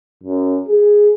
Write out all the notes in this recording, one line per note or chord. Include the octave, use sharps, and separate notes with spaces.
F#2
G#4